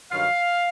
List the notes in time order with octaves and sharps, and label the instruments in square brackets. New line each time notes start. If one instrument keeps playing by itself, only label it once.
[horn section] G2 D#3 F#3 F5